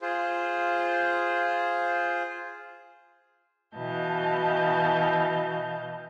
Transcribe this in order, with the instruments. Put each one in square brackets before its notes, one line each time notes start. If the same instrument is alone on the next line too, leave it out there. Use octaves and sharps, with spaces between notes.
[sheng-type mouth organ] F4 G#4 C5
[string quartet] B2 E3 D#5 F5 A5 G6